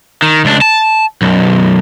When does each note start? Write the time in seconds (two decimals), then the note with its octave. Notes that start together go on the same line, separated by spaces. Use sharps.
0.22 D#3
0.45 C#2 D4
0.62 A5
1.22 B1 F#2